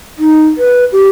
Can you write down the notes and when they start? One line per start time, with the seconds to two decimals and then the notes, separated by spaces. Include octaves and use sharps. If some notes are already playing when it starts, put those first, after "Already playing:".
0.18 D#4
0.58 B4
0.92 G4